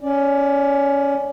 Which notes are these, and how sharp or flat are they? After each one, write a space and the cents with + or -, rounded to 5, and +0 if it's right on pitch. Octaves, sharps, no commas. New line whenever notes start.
C#4 +10 D5 -5